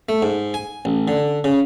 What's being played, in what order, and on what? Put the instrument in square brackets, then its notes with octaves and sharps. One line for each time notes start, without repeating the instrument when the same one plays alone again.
[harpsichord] A3
G#2
G#5
A1
D3
C#3